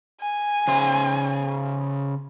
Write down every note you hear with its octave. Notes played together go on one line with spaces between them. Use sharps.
G#5
C#3 C5